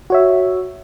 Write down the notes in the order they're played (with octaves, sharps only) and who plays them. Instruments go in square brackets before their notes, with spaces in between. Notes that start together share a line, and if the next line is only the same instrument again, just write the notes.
[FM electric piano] F#4 C#5 E5